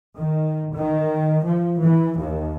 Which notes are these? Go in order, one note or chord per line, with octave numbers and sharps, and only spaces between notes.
D#3
D#3
F3
E3
D#2